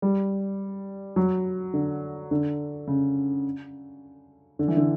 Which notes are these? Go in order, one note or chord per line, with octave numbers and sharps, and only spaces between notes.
G3
F#3
D3
D3
C#3
D3
E3
D3